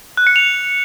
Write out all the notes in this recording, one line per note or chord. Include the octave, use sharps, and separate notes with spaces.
F#6
C#7
F7